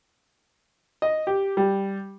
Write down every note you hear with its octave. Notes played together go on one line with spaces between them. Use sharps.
D#5
G4
G3